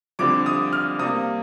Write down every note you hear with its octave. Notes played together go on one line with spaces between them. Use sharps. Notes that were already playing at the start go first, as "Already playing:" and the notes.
F2 D3 G3 D6
D#6
F6
C3 G3 A#3 D#6